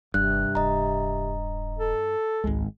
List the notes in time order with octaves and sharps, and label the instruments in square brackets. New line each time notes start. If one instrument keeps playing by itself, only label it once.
[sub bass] F#1 [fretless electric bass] G2 [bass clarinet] C3 [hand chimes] F#6
[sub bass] D#1 [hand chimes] D#5 A#5
[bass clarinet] A4
[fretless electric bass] G#1 G#3 [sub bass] C#2